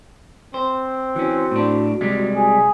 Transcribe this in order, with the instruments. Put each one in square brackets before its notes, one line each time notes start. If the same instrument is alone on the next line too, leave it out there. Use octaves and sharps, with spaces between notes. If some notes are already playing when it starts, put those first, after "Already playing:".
[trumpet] C4 [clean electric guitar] C5
[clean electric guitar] E3 C#4 [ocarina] F#4
[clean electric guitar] A2 D4
C3 G3 G#3
[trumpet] G#4